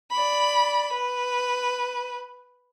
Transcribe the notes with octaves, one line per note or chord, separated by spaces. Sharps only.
D5 B5
B4